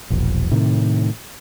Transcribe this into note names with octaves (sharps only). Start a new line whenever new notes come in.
E1 A#1
A2 C3 D#3